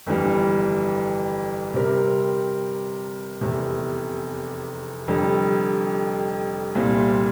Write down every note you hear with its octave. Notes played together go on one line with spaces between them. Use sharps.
G1 F2 E3 G3
C3 G3 C4 G4 A#4
F1 E2 C3
F1 F2 D3 G3
C2 A#2 G3 C4